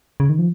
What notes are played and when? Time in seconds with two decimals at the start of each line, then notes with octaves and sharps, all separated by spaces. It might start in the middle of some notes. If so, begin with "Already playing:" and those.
0.20 C#3
0.29 D#3
0.39 F3